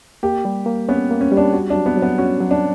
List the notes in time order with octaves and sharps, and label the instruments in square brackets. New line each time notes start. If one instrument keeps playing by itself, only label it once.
[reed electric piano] A#3 [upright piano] G4
[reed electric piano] G3
A#3
[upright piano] B3 [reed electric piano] C#4
[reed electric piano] A#3
[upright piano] C#4
[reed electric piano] G3
[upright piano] D4
[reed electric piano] F#4
[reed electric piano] F#3 [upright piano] D4
[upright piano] B3
[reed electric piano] F#3
[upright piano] B3
[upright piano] C#4 [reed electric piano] F#4
[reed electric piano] F#3
[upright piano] D4